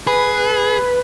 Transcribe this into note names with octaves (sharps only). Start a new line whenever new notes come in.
G#4 B4